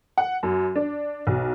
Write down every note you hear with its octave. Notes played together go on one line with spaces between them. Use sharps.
F#5
F#2
D4
B1